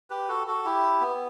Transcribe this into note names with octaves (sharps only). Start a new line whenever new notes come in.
G4 B4
F#4 A4
F#4 A4
E4 G4
B3